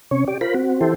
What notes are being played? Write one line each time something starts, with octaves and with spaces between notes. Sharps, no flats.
C3 C#4 C#5
G4 D5
F4 A#4 C5 B5
C4 F#4
E3 E4 G4 A4 C5